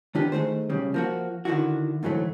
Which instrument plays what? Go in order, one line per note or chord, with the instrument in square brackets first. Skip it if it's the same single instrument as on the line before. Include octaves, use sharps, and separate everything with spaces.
[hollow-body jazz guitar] D#3 B3 D4 F4 G4
D#3 A3 G#4 C5
B1 C#3 G3
F3 A#3 F#4
D3 D#3 F3 E4 F#4
D2 G#2 E3 F#3 A3